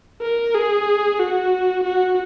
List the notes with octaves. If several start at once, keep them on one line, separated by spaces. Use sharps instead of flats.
A#4
G#4
F#4
F#4